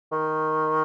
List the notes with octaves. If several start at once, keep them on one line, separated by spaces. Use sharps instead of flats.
D#3